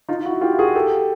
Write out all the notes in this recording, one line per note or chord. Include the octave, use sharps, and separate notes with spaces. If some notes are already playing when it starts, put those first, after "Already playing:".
D#4 F4
E4 F#4
F4 G4
F#4 G#4
G4 A4